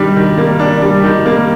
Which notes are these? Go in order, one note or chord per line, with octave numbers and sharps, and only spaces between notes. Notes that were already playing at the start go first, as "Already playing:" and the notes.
Already playing: D#3 G3 D4
D#3
A#3
D4
G3
D#3
A#3